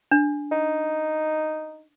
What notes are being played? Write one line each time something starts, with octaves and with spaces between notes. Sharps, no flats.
D4
D#4